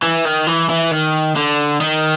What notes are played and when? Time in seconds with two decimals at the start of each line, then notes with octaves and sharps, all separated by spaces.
0.02 E3
0.25 D#3
0.47 E3
0.70 E3
0.91 D#3
1.36 D3
1.81 D#3